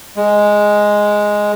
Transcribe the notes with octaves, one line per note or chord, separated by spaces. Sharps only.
G#3